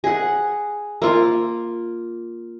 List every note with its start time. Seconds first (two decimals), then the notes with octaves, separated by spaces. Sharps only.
0.04 G#4 F#5
1.02 A#3 F4